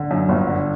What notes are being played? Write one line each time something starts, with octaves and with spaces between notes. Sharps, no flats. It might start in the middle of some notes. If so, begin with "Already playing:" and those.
Already playing: D3
F#2
G1
D3